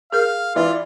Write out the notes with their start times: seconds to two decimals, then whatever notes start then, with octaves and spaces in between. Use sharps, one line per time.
0.12 G#4 A#4 F5
0.56 E3 E4 F4 D5